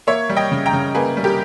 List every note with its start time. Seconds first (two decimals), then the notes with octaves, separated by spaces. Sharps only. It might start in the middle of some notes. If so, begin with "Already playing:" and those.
0.07 A#3 C#5 E5
0.29 G3
0.36 D#5 G5
0.51 C#3
0.66 G5 A#5
0.73 C#3
0.95 A#3 G#4 B4
1.17 G3
1.24 G4 A#4